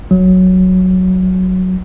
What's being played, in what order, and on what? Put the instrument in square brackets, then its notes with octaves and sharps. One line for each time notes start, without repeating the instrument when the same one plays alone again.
[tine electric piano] G#1 F#3